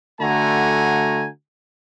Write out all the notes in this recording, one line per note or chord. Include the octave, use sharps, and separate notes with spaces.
D3 A3 F#4 G#5 A#5